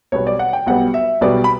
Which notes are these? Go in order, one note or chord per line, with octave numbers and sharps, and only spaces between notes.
B1 B2 G3 B3 C#5
D5
F#5
G5
B1 B2 G3 B3 F#5
E5
B1 B2 G3 B3 D5
B5